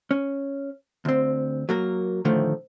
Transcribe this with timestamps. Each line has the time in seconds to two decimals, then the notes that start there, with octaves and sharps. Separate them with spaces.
0.11 C#4
1.05 D2 C4
1.69 F#3 A#3 A#4
2.25 A2 D3 D#3 F3 A3